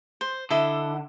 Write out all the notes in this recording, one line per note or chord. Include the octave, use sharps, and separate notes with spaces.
C5
D3 E4 A4 D#5